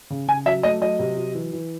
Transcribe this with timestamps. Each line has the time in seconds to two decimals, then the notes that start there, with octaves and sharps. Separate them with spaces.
0.10 C#3
0.28 C#3 G#5
0.46 F#3 E5
0.63 A3 D#5
0.81 F#3 D#5
0.99 C3
1.17 F#3
1.34 E3
1.53 E3